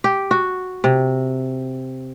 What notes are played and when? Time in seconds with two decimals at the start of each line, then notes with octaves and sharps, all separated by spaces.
0.04 G4
0.31 F#4
0.84 C3